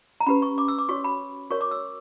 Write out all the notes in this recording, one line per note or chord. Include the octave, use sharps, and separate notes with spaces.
A#5
C#4 G4 B4 B5
C#6
D6
E6
D6
F#4 C#5 C#6
B5
F#4 A#4 C#5 C#6
D6
E6